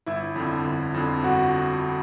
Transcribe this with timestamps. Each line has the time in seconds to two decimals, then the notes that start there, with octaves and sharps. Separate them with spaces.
0.06 G1 E4 E5
0.36 F2 D3
0.65 G1
0.94 F2 D3
1.24 G1 F#4 F#5